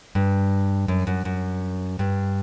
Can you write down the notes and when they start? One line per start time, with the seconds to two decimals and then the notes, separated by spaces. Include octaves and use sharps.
0.15 G2
0.88 F#2
1.07 F#2
1.25 F#2
1.99 G2